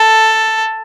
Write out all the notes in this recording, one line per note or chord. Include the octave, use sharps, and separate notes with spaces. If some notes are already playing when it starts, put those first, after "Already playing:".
Already playing: A4